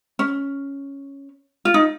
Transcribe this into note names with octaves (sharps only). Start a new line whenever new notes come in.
C#4
F4
D#4